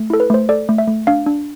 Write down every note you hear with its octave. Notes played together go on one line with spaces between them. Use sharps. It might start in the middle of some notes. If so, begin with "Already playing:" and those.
Already playing: A3
E4 A4
B4
A3 C5
A4 D5
A3
E5
A3
D4 F5
D4